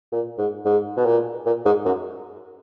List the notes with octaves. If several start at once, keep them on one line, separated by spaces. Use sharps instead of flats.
A#2
G#2
G#2
B2
A#2
A#2
G#2
F#2